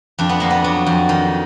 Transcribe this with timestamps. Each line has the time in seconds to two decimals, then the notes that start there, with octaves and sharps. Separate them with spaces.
0.19 F2 D4
0.29 B3
0.40 F2 A#3
0.50 B3
0.64 F#3
0.86 F2
1.09 D#3